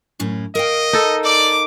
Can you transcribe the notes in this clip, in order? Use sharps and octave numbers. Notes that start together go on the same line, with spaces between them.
F#2 A2 C#4
A#4 D#5 F5 G5
D#4 A4
D5 D6